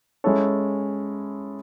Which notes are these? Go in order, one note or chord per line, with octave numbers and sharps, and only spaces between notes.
G#3 C#4 E4 A4 C#5